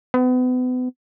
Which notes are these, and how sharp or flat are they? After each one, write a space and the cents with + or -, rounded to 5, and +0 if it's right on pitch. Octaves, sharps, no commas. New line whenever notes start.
B3 +35